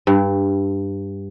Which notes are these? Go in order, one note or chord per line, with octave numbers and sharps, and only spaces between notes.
G2